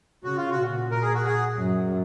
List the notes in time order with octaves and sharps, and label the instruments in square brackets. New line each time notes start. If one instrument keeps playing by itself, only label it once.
[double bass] C#3 [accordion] F#4
[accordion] F4
F#4
[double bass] A#2
[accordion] A#4
G#4
F#4
G#4
[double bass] F#2